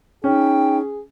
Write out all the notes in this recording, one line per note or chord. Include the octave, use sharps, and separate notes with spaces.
C#4 D#4 G#4 G5